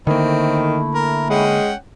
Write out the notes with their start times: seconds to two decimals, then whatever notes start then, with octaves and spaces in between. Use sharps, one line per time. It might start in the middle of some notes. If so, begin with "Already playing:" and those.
0.07 D3 D#3 A3 A#3 C4 E4
0.95 A#4
1.30 G#3 C#4 F#5 G5